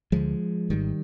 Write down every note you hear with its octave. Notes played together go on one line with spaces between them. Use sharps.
D2 D3 F3 G#3
G#1 G#2 D#3 G3